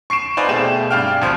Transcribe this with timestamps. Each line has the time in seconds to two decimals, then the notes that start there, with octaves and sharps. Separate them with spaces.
0.10 C#6 C7 D7 E7
0.37 D#4 B4 C5 D5 F5 G#5
0.48 B2 A3 G4 G#4 E7
0.90 G2 D5 F5 G5 F6
1.22 G#1 D2 F3